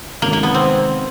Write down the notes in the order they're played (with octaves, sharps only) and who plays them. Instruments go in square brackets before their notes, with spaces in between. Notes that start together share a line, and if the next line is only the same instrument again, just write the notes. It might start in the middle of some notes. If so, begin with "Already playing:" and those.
[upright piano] C3 D#3 G#3 C#4 F#4 [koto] A#3
[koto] A#3
B3
C4